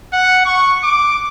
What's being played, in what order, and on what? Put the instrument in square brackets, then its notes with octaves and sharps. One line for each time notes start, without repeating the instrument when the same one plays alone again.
[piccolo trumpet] F#5
C#6
D6